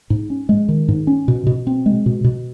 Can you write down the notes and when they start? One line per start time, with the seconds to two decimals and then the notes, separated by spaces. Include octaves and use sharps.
0.10 G#2
0.30 C#4
0.49 G#3
0.69 D#3
0.88 G#2
1.07 C#4
1.28 B2
1.47 B2
1.67 C4
1.86 G#3
2.06 B2
2.24 B2